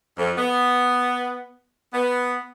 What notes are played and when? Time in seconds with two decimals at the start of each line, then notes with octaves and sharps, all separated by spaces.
0.18 F2
0.37 B3
1.93 B3